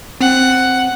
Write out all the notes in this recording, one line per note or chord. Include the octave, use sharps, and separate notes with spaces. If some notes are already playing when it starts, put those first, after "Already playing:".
C4 F#5